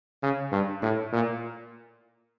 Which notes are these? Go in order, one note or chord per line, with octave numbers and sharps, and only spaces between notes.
C#3
G2
A2
A#2